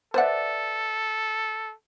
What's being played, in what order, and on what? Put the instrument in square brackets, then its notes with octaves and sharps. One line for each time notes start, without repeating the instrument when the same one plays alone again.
[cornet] A4 [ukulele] B4 D5 E5 [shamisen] C5 F#5